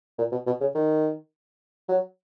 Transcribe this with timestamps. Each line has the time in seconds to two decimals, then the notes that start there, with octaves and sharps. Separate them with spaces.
0.18 A#2
0.32 B2
0.47 B2
0.61 C#3
0.75 D#3
1.89 F#3